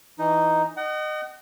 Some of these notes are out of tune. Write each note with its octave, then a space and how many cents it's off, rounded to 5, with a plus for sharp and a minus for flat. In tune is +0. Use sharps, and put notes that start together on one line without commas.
E3 +0 D#4 +0
D#5 -20 F#5 +40